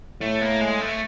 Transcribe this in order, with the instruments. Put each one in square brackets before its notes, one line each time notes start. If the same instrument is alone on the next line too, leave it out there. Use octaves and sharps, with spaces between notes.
[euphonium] A2 [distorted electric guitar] A3
[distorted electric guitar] A#3
G#3
A3